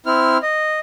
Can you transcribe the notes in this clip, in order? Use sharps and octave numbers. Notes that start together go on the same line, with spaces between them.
C4 E4 F6
D#5